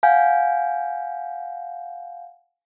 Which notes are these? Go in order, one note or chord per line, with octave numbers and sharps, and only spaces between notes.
F5 F#5 G#5 G6